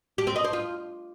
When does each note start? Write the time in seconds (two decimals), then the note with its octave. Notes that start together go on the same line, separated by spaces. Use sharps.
0.18 G4
0.27 C4
0.36 D#5
0.44 C5
0.53 F4